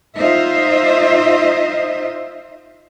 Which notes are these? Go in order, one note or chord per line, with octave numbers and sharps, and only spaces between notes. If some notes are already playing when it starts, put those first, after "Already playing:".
D#4 F4 C5 D#5 E5